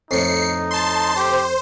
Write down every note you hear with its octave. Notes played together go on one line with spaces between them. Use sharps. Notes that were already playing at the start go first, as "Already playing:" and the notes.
F2 A2 D#4 C7 C#7
A5 C6
G4 C5